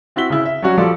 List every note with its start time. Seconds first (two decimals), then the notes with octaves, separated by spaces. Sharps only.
0.16 C4 E4 F#4 B6 G7
0.30 C#3 E4
0.45 E5
0.62 F#3 G3 C#4 F#4
0.78 F3 G3 F4 F#4 A4 D5